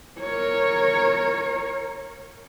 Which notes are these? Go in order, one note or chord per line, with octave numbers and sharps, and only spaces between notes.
A#4 C#5